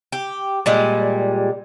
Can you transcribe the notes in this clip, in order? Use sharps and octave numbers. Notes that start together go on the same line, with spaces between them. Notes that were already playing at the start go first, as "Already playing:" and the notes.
G4
A#2 G3 G#3